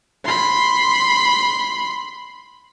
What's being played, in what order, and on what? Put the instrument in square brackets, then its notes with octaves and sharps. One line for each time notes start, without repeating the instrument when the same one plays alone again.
[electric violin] B5 C6